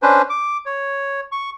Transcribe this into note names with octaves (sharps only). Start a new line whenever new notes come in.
C#4 D4 B4 C5
D6
C#5
C#6